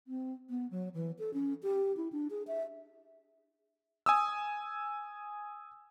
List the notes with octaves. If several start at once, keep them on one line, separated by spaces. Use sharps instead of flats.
C4
B3
F#3
E3
A4
C#4
G4
E4
D4
G#4
E5
G#5 D#6 E6